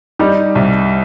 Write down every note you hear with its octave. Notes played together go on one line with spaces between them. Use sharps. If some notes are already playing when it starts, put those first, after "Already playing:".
G3 D#4 G4
C2